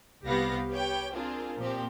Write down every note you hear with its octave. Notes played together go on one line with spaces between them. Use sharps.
C2 B3 G4 F5 F#5 A#6
G4 B4 C#5 G5
C4 D4 F4 G#4 A#4
A#2 F3 C4 G4